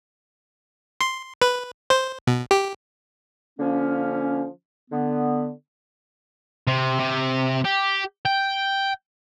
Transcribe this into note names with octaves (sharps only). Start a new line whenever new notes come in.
C6
B4
C5
B2
G4
D3 F3 A#3 C#4
D3 B3
C3
C3
G4
G5